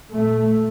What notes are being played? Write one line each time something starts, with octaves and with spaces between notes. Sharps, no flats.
A#2 A3